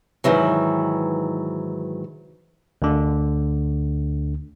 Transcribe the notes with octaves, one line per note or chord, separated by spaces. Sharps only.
G#2 D#3 E3 F#3
D2 D3